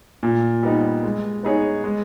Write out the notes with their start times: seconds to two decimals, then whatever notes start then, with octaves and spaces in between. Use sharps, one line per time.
0.23 A#2
0.63 G3 B3 D#4
1.03 G#3
1.43 B3 D#4 G#4 C#5
1.84 G#3